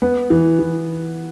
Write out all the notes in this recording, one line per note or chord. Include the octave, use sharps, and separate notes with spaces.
B3
E3
E3